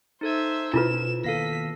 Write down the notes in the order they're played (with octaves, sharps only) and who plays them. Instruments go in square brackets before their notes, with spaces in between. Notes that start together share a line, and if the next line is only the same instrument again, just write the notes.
[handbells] D#4 A4 G#6 [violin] C5 E5
[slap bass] B2 [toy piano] E4 F4 B4 [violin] E7
[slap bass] D#3 A#3 B3 [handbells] A4 F5 A#6 [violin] B6